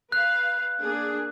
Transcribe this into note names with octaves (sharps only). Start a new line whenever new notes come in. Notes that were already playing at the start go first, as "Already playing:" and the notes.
B4 F5 F#6
A#3 D4 G#4